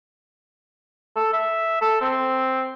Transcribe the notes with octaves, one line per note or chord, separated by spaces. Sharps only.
A4
E5
A4
C4